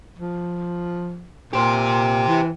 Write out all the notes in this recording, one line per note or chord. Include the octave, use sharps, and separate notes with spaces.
F3
A#2 G4 C5
E3